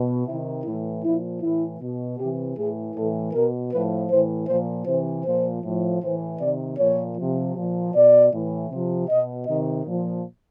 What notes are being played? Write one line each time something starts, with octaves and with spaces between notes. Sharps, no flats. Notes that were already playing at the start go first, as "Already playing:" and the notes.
Already playing: B2
C3 D#3 E4
A2 E3 E4
A#2 F3 E4
A2 E3 E4
B2
C3 E3 G4
A2 E3 G#4
A2 E3 A4
B2 A#4
A2 F3 B4
A2 E3 C5
A#2 F3 C5
C3 E3 C5
A#2 F3 C5
A2 F3
A2 E3 C5
C3 D#3 D5
A#2 F3 C#5
C3 F3
A#2 F3
B2 D5
A2 E3
C3 F3
B2 D#5
C3 D#3 D#5
A#2 F3